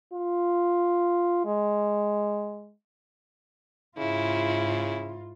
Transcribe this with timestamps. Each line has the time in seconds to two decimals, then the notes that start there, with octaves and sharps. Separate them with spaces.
0.13 F4
1.45 G#3
3.98 G#2 C#3 E4 F4